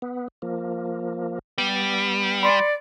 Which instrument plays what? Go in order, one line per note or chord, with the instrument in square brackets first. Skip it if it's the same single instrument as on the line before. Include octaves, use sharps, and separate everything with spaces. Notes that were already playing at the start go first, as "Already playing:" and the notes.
[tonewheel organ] B3
F3 A#3
[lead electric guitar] G3 [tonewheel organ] B3
[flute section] D5 [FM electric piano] B5 C6 C#7